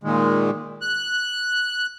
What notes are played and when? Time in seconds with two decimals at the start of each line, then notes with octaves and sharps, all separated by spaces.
0.04 A#2 D#3 G#3
0.81 F#6